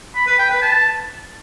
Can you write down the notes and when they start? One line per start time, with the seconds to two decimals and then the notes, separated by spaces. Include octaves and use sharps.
0.15 B5
0.27 B4
0.39 G5
0.50 B4
0.62 A5